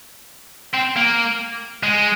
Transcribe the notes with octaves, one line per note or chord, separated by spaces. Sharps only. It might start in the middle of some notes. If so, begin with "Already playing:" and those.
C4
A#3
G#3